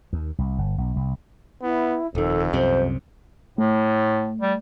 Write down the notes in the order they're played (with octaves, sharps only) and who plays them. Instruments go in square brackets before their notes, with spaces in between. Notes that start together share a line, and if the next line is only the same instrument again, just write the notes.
[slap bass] D#2
C2
G1
B1
C2
[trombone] B3 [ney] E4
[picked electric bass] D#1 D#3 [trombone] F2 [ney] A4
[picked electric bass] C2 F#2 C3 [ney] C5
[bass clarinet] A2 [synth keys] A3
[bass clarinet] G3